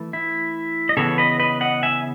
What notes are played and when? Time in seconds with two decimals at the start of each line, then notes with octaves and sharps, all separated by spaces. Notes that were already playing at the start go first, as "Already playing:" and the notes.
Already playing: E3 A3
0.13 E4
0.89 D#5
0.97 C#3 E3 B3 A4 C#5
1.18 B4 D#5
1.40 B4 D#5
1.61 D#5 F#5
1.83 E5 G#5